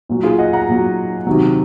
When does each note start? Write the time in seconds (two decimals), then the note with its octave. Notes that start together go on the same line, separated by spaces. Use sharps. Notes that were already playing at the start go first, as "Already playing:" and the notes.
0.09 A#2 F#3
0.23 F4 G#4
0.38 D#5 F#5
0.53 F#5 A#5
0.68 A#2 F#3
1.27 C3 D#3 F#3